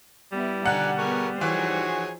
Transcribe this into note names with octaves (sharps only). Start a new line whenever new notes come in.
G3 B3 E4
B2 D3 D#3 D5 F#5 G#5 A#5 F#6
B3 G#4 A#4 C#6
E3 F3 D#4 F#4 G#4 C5 C#5